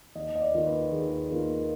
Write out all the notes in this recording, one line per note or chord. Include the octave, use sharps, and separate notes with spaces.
D#2 D#5
D#5
D5
D#3 A#3 F4
B4
D#2 G#4
D#3 A#3 F4